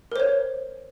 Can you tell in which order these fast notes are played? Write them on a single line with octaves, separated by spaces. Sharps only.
A#4 C5 C#5